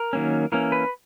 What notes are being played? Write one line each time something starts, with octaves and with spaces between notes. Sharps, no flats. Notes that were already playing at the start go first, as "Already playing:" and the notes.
Already playing: A#4
D#3 F#3 A#3 C#4
E3 A#3 C#4 A#4
B4